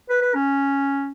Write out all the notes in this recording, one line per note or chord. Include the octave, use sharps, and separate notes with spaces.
B4
B4
C#4